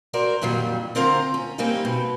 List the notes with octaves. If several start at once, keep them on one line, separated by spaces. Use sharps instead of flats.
F#4 A#4 C5 D5
F2 A#2 D#3 F#3 G3
D3 C4 F4 A#4 C5 A#5
C#4
G3 A#3 C4 C#4 D#4 G4
B2